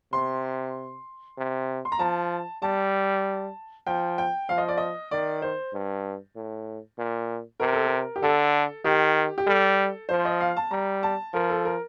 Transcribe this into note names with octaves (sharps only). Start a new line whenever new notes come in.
C3 C6
C3
C6
A#5
F3 A5
G3 A5
F3 G5
G5
F3 F5
D#5
D5
D#5
D#3 D5
C5
G2
A2
A#2
C3 A#4
A4
A#4
G4
D3 A4
D#3 G4
G4
G3 A4
F3 C5
D#5
F5
A5
G3 A#5
A5
F3 A#4
A4
A#4